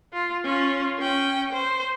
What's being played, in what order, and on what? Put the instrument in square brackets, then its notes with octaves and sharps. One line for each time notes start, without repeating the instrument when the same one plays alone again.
[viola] F4
C#4 F4
C#4 G5
C5